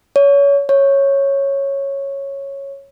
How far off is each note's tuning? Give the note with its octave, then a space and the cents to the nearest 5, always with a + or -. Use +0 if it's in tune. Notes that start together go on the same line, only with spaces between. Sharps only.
C#5 +25
C#5 -5